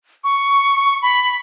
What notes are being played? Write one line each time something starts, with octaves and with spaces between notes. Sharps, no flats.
C#6
B5